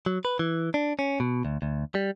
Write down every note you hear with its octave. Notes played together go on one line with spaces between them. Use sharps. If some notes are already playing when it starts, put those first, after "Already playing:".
F#3
B4
E3
D4
C#4
B2
D2
D2
G3